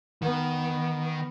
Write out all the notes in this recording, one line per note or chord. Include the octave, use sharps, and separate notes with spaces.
D#3 B3